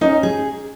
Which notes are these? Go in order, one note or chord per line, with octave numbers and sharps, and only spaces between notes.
C#4 D#4
G#4